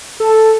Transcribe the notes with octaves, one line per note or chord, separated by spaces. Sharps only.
A4